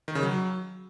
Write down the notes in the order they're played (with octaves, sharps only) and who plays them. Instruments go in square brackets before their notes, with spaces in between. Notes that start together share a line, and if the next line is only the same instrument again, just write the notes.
[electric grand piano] D#3
C#3
F#3